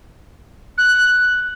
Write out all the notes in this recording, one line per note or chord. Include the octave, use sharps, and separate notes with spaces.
F#6